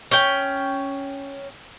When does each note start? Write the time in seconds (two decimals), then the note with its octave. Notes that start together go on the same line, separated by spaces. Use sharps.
0.11 C#4 G5